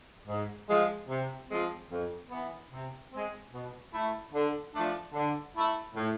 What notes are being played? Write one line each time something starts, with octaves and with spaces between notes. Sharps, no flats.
G#2
F3 G#3
C3
F3 G#3 C4
F2
E3 B3
C3
G#3 C4
B2
A3 E4
D3
F3 A3 D4
D3
A3 E4
A2